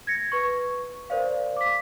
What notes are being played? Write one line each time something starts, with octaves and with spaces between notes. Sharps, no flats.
G#6 A#6 C#7
B4 C#6
A#4 C5 D5 F5
D6 B6